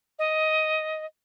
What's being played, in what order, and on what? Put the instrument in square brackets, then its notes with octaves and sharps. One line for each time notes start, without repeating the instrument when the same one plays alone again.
[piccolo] D#5